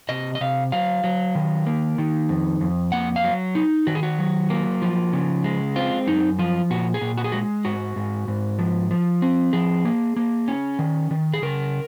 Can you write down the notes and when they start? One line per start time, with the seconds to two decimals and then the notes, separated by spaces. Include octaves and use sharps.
0.09 C3 D#5
0.35 D#5
0.41 C3 F5
0.72 F#3 F5
1.04 F#3
1.35 D#3
1.66 A#3
1.98 D#3
2.29 F2
2.61 F2
2.92 A#3 F#5
3.16 F5
3.24 F#3
3.55 D#4
3.87 D#3 F#4
3.95 G#4
4.03 F#4
4.18 F#3
4.50 A#3
4.82 F3
5.13 C#3
5.44 G#3
5.76 C4 F4
6.07 F#2 D#4
6.39 F3 F4
6.70 A#2 F#4
6.94 G#4
7.01 A#2
7.18 F#4
7.24 G#4
7.32 G#3 F#4
7.65 G#2 F#4
7.96 G#2
8.28 G#2
8.59 F3
8.91 F3
9.22 C4
9.53 F3 G#4
9.85 A#3
10.16 A#3
10.48 C#4
10.79 D#3
11.11 D#3
11.34 G#4
11.42 C#3 A#4